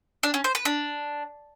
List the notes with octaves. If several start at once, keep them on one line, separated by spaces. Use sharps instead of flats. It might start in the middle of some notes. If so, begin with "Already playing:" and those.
D4
C#4
C5
B4
D4